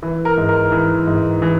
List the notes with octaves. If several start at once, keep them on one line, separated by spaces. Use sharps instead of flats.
E3
A#4
G#2
A#4
E3
G#2
E3